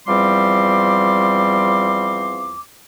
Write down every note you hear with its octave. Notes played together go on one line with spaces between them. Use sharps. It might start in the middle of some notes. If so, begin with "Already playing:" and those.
E2 F3 G3 C4 C6 D6